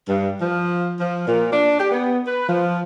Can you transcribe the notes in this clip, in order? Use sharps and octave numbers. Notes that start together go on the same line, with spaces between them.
G2
F3
F3
A#2
D4
G4
B3
B4
F3